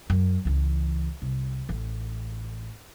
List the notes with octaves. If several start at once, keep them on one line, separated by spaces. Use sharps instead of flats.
F#2
C#2 E3
C2
A1